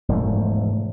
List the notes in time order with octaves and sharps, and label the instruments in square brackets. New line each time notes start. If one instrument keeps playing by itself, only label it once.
[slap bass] E1 G#2 F3 A3